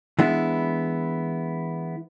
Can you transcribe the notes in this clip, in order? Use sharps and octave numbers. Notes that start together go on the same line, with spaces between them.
E3 G#3 B3 D4 E4